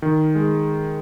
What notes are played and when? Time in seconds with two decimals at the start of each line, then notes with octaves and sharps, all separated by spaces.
0.02 D#3
0.35 G#3